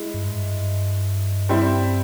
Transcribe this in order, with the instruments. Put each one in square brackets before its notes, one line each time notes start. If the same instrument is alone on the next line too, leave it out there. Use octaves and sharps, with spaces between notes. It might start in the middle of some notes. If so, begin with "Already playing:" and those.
Already playing: [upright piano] G#3 E4
[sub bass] G2
G#2
G2
[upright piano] G3 C4 E4